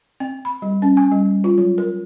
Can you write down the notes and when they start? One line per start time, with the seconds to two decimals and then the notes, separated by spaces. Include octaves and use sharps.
0.20 C4
0.45 B5
0.62 G3
0.82 C#4
0.97 G#5
1.12 G3
1.44 F4
1.58 F#3
1.78 A#4